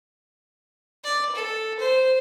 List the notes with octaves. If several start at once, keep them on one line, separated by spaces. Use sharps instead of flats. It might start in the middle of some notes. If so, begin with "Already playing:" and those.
D5
A4
C5